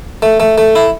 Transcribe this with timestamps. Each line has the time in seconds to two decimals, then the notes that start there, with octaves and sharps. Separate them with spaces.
0.22 A3
0.40 A3
0.58 A3
0.76 E4